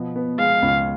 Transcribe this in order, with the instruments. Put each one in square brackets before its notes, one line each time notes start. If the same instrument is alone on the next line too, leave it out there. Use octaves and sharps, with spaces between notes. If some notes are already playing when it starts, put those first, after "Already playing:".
Already playing: [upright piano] B2 F3
B3
[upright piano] G#3 [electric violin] F5
[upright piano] C#2